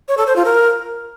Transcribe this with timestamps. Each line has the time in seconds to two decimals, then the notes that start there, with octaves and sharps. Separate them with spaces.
0.08 C#5
0.17 A4
0.27 C5
0.36 F4
0.45 A#4